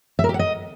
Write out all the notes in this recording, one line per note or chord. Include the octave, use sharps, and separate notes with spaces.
E5
A#4
G4
F#5
D#5